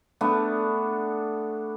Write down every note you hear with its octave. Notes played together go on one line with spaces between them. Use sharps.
A3 B3 D4